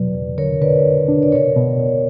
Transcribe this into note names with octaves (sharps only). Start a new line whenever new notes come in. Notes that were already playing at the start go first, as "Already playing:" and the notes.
Already playing: E2 B2 F#3 B4 D5
E2
D3 A#4 C#5
D3 B4 D5
D3
D4
D5
B2 A#4 C#5
B2
B2